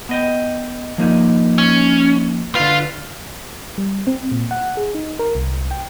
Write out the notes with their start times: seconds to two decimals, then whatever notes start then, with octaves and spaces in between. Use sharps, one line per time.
0.09 B3 D#5 G5
0.98 F3 A#3 D#4
1.58 C#4
2.55 D3 F4 B4 F5
3.78 G3
4.07 C4
4.32 A#2
4.51 F#5
4.77 G#4
4.95 D#4
5.19 A#4
5.35 C2
5.71 G5